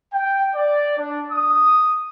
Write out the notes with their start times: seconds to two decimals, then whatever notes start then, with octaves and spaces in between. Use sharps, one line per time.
0.13 G5
0.55 D5
0.98 D4
1.31 D#6